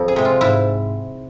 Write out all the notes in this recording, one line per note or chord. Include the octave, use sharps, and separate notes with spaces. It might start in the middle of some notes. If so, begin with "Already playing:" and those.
Already playing: F2 F3
G#4
C3 G#3
F4
G#2 E4